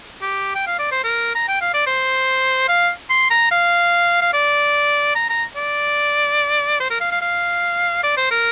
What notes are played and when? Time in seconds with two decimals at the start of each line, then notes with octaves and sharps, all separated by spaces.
0.22 G4
0.55 G5
0.67 F5
0.79 D5
0.92 C5
1.04 A#4
1.36 A#5
1.48 G5
1.61 F5
1.74 D5
1.87 C5
2.69 F5
3.10 C6
3.31 A#5
3.51 F5
4.22 F5
4.34 D5
5.15 A#5
5.30 A#5
5.56 D5
6.80 C5
6.91 A#4
7.01 F5
7.12 F5
7.22 F5
8.04 D5
8.17 C5
8.31 A#4